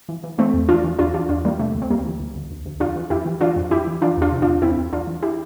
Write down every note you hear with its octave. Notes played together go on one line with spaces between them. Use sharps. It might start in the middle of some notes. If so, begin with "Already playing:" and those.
E3
E3
E3 A3 C4
E2
E3 D4 F4
E3
E2 D4 F4
E3 D4 F4
E2 D4 F4
E3 G3 A#3
C3 A3
D2
C4
D2 G3 A#3
E3
D2
D2
D2
D2
F2 D4 F4
E3
F2 E4 G4
E3
E3 D4 F4
F2
F2 E4 G4
E3
E3 D4 F4
E2 D4 F4
C3
E2 D4 F4
E2 C4 E4
E2
E2 D4 F4
E3
E4 G4